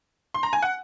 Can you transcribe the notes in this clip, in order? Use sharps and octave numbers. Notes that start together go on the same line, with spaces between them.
C6
A#5
G#5
F#5